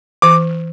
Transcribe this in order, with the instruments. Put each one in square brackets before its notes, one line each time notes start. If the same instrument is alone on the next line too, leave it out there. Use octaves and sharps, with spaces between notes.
[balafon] E3 [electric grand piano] D6